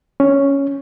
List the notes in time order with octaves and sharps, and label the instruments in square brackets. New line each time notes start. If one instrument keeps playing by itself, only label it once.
[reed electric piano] C#4